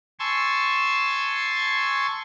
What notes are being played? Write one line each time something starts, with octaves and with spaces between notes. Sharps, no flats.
G#5 A5 C6 C#6 E6